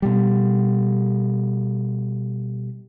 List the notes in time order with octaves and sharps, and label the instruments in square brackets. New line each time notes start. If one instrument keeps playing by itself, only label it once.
[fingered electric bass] B2 G3